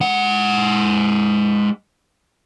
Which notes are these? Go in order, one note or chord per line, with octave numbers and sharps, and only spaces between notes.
G#3 F#5